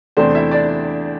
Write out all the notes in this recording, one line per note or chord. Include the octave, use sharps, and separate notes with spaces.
E2 C3 A3 C4 D4 C5
E4 E5
D4 D5